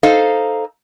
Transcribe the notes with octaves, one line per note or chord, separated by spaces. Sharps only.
D#4 A4 C5 F5